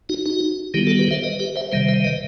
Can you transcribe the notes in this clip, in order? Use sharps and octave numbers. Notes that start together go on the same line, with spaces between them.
D#4 F#4
D#4 F#4
D#3 G3 B3 E4 G4
F#4 A4
G4 B4
C5 E5
B4 D#5
G4 B4
C5 E5
C3 D#3 G3 C5 E5
C5 E5
B4 D#5